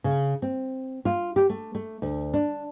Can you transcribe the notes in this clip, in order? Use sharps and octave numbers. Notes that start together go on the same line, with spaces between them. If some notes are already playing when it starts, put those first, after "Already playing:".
C#3
C4
F4
G4
A3
A3
D2
D4